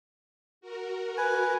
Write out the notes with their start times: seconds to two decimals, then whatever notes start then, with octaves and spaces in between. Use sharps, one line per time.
0.61 F#4 A#4
1.18 B4 G#5